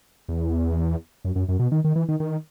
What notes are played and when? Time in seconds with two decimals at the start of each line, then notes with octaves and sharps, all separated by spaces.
0.29 E2
1.25 F#2
1.36 F#2
1.49 F#2
1.59 B2
1.72 D#3
1.84 D#3
1.96 E3
2.08 D#3
2.20 D#3